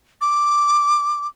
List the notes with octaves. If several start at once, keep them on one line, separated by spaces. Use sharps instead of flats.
D6